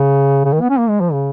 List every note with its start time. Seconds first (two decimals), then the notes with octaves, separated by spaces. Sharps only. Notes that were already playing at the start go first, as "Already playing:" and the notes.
Already playing: C#3
0.45 C#3
0.53 D#3
0.61 B3
0.70 C#4
0.79 A#3
0.89 G#3
1.01 F3
1.12 C#3